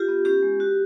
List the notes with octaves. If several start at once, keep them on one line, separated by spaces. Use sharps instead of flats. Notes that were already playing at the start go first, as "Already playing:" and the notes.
Already playing: F4 G4
B3
C#4 G4
G#3
F#4